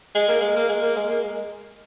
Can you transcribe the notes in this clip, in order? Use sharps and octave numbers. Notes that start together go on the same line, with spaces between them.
G#3
A#3
G#3
A#3
G#3
A#3
G#3
A#3
G#3